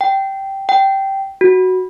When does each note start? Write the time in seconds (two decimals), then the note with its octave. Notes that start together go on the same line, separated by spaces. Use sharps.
0.01 G5
0.69 G5
1.41 F#4